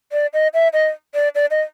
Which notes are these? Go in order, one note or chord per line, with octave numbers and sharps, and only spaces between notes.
D5
D#5
E5
D#5
D5
D5
D#5